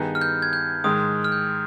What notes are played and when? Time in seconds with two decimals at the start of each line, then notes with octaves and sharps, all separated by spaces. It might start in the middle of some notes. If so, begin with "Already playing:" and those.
Already playing: G2 D#3 B3 D#4 G#4
0.15 F6
0.21 G6
0.42 G#6
0.53 G6
0.84 G#2 D#3 G#3 D#6
1.24 F6
1.32 G6